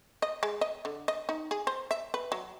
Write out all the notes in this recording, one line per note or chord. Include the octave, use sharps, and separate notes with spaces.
D#5
G#3
D#5
D3
D#5
D#4
G#4
C5
E5
B4
F#3